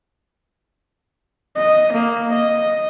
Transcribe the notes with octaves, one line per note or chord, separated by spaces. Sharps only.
D#5
A#3
D#5